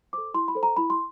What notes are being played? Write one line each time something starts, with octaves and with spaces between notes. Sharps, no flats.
A4 C5 D6
E4 C6
B5
A4 C5
A#5
E4 B5
C6